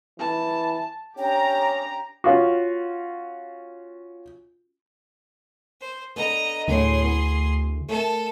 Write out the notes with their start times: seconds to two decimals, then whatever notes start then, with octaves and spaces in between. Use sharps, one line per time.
0.20 E3 A5
1.18 C#4 D4 G4 G5 A#5 D6
2.24 C#4 F4 F#4
5.81 C5
6.16 D3 B3 D#5 A#5
6.68 D2 A2 F#3 B3 G#4 C6
7.03 B3
7.89 A3 A4 A#4 A5